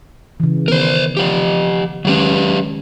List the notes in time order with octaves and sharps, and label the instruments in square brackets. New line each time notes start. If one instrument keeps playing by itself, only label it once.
[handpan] C#3 E3
[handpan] D#3 B3 [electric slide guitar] A#4 C5
[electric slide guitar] F3 G4
[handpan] D#3 G#3 C#4 [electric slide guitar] F#3 G4 B4